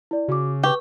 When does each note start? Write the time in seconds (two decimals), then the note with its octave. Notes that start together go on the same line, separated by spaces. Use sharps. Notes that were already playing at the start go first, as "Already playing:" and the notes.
0.11 E4 D5
0.28 C#3 F#4 D6
0.63 G4 B4 C#6 G6